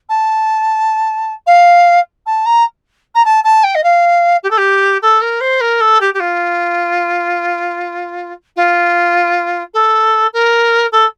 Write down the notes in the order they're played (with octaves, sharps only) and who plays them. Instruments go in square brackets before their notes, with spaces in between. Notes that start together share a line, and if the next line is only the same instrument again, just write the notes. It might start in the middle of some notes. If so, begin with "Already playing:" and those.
[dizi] A5
F5
A5
A#5
A#5
A5
A5
G5
D#5
F5
G4
A4
G4
A4
A#4
C5
A#4
A4
G4
G4
F4
F4
A4
A#4
A4